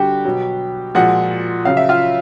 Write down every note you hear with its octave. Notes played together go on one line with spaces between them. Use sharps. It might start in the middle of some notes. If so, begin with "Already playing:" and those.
Already playing: D3 G3 F#4 G4 G5
B2 F#3
A#2 F3 G#3 F#4 F#5
C#3 F#3 F5
E5
F4 F5